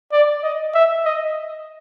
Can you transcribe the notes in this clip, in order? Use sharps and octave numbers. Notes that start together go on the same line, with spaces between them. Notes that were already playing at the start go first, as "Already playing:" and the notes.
D5
D#5
E5
D#5